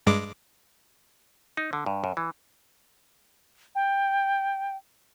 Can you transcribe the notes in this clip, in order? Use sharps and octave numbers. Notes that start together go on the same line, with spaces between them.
G2 G#3 D6
D#4
D3
G2
F#2
E3
G5